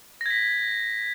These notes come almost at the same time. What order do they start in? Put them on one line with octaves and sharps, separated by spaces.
A#6 G#6 B6